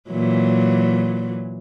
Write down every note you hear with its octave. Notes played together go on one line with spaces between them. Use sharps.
A#2 E3 F#3